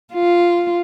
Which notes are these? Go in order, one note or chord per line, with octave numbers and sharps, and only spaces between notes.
F4